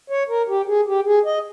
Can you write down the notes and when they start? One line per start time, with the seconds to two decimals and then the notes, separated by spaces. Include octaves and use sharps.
0.10 C#5
0.29 A#4
0.48 G4
0.67 G#4
0.87 G4
1.06 G#4
1.25 D#5